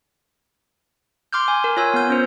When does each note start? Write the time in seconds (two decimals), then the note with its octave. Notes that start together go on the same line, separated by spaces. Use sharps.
1.33 C6 D6 F6 G6
1.48 G#5
1.64 A#4
1.77 F4 C#5 G#5 E6
1.94 B3 G6
2.10 C#4 C5